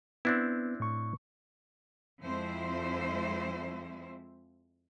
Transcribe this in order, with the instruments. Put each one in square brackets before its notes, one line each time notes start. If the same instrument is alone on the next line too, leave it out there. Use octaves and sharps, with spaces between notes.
[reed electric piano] B3 [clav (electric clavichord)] C4 D4 E4
[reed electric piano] A2 C#6
[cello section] F2 F3 G#3 C4 E4 C5